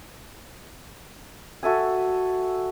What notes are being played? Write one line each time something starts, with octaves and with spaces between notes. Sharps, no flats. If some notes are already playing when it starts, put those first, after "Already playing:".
F#4 A4 E5 G#5